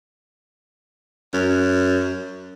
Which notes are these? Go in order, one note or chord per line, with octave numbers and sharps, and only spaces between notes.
F#2